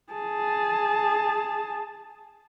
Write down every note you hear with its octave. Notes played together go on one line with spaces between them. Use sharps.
G#4 A5